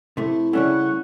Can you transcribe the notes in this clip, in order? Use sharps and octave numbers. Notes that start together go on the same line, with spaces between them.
C3 A3 E4
C#3 G3 A3 C#4 F#5 C#6 F#6